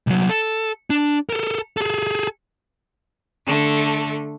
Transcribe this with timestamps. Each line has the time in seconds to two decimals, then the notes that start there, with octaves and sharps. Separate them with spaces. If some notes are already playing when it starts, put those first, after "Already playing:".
0.07 C2 F#3
0.29 A4
0.90 D4
1.29 A4 A#4
1.77 G#4 A4
3.46 D3 A3